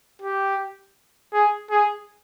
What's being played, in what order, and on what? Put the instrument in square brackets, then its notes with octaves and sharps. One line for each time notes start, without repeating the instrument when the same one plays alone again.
[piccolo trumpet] G4
G#4
G#4